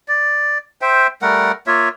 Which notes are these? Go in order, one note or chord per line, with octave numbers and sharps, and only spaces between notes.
D5
C5 E5 G5
G3 A3 A#4 F#5
A#3 F4 C#5 E5